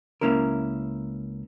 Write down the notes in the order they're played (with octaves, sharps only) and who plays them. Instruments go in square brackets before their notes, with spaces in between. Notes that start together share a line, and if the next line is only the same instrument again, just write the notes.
[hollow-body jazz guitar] C#2 G2 A#3 C#4 E4 A#4